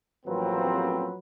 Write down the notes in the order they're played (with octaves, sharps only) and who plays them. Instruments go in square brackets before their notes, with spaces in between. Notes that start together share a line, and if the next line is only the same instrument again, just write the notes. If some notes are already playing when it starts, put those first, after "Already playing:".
[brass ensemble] A1 A#3 C4 [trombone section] F3 F#3 B4